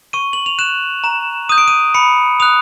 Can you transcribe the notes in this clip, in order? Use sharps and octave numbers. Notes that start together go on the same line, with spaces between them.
C#6 D#7
F#7
F7
F#6 E7
A#5 E7
D#6 G6 D#7
D7
D#7
B5 C#7
D#6 F#6 F7